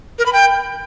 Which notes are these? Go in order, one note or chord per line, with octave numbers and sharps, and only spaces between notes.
A#4
B5
G5